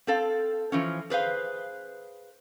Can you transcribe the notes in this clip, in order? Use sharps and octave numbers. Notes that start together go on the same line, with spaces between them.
C4 A4 F5
E3 F3 C#4
G#4 B4 C5 F5